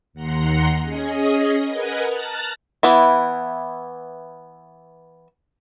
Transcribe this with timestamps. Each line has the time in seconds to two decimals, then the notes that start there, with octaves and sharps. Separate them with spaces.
0.14 D#2 F#5 A#5 C6 C#7
0.79 C#4 G#4 D#5
1.63 A#4 B4 D#5 F#5 G#5
2.07 A5 A#5 F6 F#6 A6 A#6
2.83 E3 B3 E4